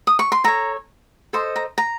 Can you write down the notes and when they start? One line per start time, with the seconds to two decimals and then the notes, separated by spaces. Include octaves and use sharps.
0.07 D#6
0.19 C#6
0.32 C6
0.44 A4 C#5 A#5
1.33 A4 C5 D#5 C6
1.56 A#5
1.78 A#5